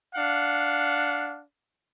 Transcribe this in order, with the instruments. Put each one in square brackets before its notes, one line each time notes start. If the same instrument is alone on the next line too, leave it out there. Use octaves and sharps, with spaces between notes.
[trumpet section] D4 F5 F#5